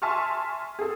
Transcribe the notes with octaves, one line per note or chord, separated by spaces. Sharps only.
E5 G#5 A5 C6 C#6 F6
G#4 A4